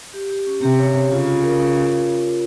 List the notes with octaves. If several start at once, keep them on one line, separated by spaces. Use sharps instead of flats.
G4
G4
C#4
C3 G4
C#5
C#5
C#3 F4
F4
A#4